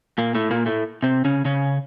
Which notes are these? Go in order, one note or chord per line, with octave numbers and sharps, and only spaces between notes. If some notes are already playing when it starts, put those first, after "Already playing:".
A#2 A#3
A2 A3
A#2 A#3
A2 A3
C3 C4
C#3 C#4
C#3 C#4